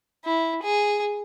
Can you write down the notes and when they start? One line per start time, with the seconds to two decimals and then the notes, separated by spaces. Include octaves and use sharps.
0.25 E4
0.63 G#4